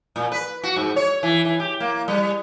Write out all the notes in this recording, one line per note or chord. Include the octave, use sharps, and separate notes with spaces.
A#2
B4
F#4
G#2
C#5
E3
E3
G4
A#3
G3